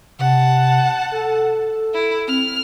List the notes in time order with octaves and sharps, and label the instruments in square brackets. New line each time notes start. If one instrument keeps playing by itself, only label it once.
[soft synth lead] C3 [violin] F#5 A5
[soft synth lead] A4
[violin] E4
[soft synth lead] C4 [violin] F6